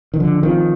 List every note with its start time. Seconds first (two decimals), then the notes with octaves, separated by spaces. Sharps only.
0.14 D#3
0.20 D3 F3
0.43 D#3 C4 F4